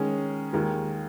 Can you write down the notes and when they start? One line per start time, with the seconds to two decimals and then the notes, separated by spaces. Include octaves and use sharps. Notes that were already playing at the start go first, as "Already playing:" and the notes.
Already playing: D#3 G#3 C#4 G#4
0.53 D#2 D#3 G#3